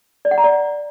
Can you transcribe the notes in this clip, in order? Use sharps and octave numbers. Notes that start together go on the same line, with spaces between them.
D5
F#5
A#5
D5